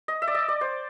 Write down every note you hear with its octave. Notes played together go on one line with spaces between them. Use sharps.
D#5
E5
D5
D#5
D5
C5